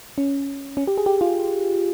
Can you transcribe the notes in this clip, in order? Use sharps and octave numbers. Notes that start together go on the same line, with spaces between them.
C#4
C#4
G4
G#4
G4
F4